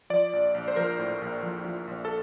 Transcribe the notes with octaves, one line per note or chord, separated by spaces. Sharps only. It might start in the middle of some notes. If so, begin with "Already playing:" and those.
F3 D5
A#1
A#1
C5
F3 A#4
A2
A#1
F3
F3
A#1
A4